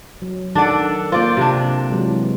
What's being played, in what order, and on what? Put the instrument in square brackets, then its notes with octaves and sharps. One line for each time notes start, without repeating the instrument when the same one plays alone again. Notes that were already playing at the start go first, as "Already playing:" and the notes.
[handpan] F#3
[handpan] D#3 A4 F#5 [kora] D4 D5
[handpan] A#3 C5 [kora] F4 D5
[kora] C3 D4
[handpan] E3 F#3 G#3